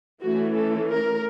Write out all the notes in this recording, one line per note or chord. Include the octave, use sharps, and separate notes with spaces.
E3 A3 C#4 F#4
A4
A#4